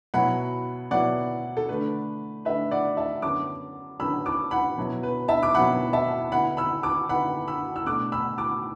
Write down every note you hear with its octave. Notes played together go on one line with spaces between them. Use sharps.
B2 F#3 B3 E4 F#5 B5
B2 F#3 B3 E4 D5 F#5
A4
D3 A3 D4 B4
D3 A3 D4 B4 E5
D5 F#5
E5 A5
F#2 D3 B3 A5 D6
F#2 D3 B3 B5 E6
A5 D6
F#5 B5
B2 F#3 B3 E4
B4
E5 A5
D6
B2 F#3 B3 E4 F#5 B5
E5 A5
D3 B3 E4 F#5 B5
B5 E6
A5 D6
D3 B3 E4 F#5 B5
B5 E6
E6
B2 A3 D4 D6 F#6
B5 E6
A5 D6